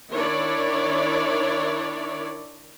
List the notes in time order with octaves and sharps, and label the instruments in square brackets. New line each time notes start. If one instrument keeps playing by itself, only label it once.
[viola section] D#3 D4 E4 C#5 D5